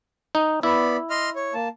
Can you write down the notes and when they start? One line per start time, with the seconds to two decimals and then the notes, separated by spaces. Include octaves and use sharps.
0.35 D#4
0.63 B3 E4 D5 B5
1.10 D#5 C6 F6
1.36 C#5
1.54 A#3 A5